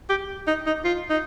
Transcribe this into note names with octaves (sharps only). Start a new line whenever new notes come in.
G4
D#4
D#4
F4
D#4